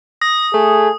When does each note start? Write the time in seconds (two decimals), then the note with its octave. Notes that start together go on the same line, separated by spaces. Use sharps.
0.22 D#6 A#6
0.54 A3 G#4